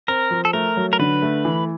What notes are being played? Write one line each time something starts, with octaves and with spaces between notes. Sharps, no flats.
C4 A#4
F3
A4
A3 A#4
F#3
A#4
D3 B4
A3
E3